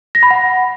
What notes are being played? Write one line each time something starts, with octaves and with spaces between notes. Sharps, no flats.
A#6
B5
F#5